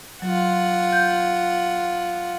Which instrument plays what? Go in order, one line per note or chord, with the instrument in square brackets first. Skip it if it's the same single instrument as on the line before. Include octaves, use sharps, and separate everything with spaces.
[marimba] F#3 [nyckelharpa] F4 F#5
[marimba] G6